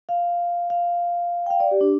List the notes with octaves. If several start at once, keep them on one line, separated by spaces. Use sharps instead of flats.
F5
F5
G5
F5
D5
G4
D4